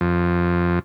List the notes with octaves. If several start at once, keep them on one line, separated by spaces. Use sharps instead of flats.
F2